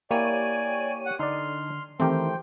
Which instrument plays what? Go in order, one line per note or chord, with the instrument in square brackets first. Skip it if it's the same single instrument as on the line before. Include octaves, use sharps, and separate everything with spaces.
[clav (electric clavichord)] A#3 E4 [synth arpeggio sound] G4 C#5 D#7 [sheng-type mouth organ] D5 G#5
[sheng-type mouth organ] F#5
[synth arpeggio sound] D3 [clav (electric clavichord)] D#4 D5 [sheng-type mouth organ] C6 F6
[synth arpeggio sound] D#3 E3 C4 [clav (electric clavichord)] A3 G4 A#4 [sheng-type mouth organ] C5 G5